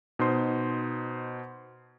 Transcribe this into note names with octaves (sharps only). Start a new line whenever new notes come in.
B2 D#4 C5 C6